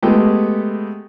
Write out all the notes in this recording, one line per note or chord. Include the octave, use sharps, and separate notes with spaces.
G#3 A3 B3 G4